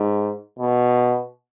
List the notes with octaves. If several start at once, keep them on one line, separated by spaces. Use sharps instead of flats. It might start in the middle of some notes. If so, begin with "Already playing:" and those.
Already playing: G#2
B2